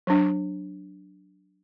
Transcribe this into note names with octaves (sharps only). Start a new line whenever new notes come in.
F#3 D4